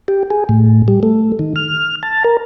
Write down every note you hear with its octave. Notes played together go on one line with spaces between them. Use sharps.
G4
G#4
A2
G3
A3
D#3
F6
A5
A#4